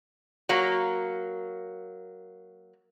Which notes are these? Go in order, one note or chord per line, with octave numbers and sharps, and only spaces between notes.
F#3 A#3